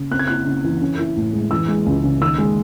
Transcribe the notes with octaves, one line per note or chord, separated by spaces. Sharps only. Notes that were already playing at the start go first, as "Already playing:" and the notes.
Already playing: C#3
C4 F#6
G#6
E4 F#6
C#3
E3
C#4
E4
A2
G#3
E3 E6
G#3
C#2
C#3
D#3 E6
G#3